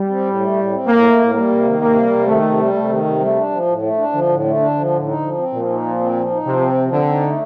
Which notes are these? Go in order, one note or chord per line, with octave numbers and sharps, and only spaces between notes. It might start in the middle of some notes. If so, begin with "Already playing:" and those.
Already playing: G3
C4
A2
A3
A2
C4
A2 A#3
A3
A2
G3 A#3
C3
D#3
C3 A#3
G3
C3
D#3 A3
C3
G3
C3 A3
D#3
C3
G3 A3
D4
F3
A2
A3
D4
D3 F3
A2
A3
D4
F3
A2
D#4
F3
C4
A#2 F3
D#4
F3
C4
F3
D#4
C3 F3
C4
F3
D3 C4
D#4
A3